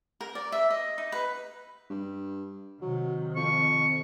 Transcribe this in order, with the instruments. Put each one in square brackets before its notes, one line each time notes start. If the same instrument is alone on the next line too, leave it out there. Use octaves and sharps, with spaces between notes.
[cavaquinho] A#4
D5
E5
D#5
D#4
B4
[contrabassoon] G2
[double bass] C3 D#3 [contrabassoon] F#3
[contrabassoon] F2 [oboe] C#6